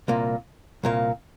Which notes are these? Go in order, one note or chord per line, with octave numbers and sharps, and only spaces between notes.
C2 A#2 A#3
C2 A#2 A#3